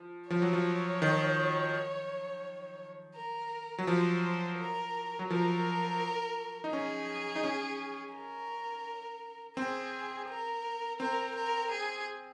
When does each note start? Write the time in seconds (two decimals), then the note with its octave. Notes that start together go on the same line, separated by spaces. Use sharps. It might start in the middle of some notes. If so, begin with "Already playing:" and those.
Already playing: F3
0.30 F3 C#5
0.42 F#3
0.53 F3
1.02 D#3
3.16 A#4
3.78 F#3
3.87 F3 C5
4.58 A#4
5.19 F#3
5.30 F3 A#4
6.64 D#4
6.72 C#4 G#4
7.36 D#4
7.44 C#4
8.15 A#4
9.57 C4 G#4
10.29 A#4
11.00 C4 A#4
11.36 A#4
11.71 G#4